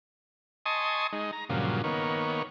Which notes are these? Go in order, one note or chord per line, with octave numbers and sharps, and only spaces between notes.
D#5 G#5 A5 C6 C#6 D#6
G#3 D#4
A#5
G2 A#2 C#3 F3 F#3
D#3 A#3 B3 C#5